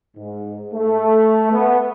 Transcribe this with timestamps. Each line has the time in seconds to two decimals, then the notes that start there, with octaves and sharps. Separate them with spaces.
0.16 G#2
0.73 A3
1.52 B3